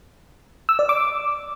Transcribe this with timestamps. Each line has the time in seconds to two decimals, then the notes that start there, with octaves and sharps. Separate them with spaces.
0.69 E6
0.79 D5
0.89 D6